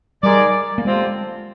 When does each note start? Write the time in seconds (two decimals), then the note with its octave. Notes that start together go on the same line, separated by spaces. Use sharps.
0.23 G3 G#3 D#4 A#4 D5
0.78 A#3
0.85 D3 G3 G#3 C4 F4